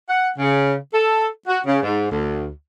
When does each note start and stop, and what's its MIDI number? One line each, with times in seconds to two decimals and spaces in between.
0.09 0.28 78
0.38 0.74 49
0.93 1.28 69
1.48 1.60 66
1.66 1.80 49
1.83 2.08 44
2.11 2.49 38